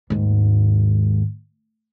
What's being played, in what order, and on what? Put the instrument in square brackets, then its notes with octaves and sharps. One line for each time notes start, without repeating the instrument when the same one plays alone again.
[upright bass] D#2 G#2